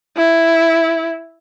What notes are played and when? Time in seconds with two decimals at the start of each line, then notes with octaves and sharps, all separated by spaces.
0.17 E4